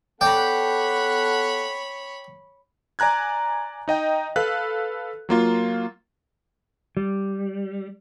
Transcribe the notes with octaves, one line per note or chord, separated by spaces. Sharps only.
B3 A4 C#5 D5 F#5 G5 A5 B5
D5 G#5 A#5 F#6 G#6
D#4 D#5 G5
A4 B4 F5 F#6
F#3 A#3 F4
G3